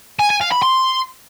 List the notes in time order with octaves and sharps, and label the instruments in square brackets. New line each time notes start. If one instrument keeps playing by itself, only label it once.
[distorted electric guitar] G#5
G#5
F5
B5
C6